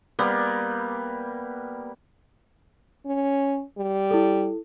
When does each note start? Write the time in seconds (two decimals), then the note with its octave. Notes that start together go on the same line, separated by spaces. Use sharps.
0.19 G3 A#3 B3
3.06 C#4
3.78 G3
4.11 E4 A4